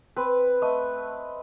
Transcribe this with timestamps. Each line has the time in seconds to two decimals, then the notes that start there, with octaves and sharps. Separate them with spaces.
0.16 C4 B4
0.62 A3 D#5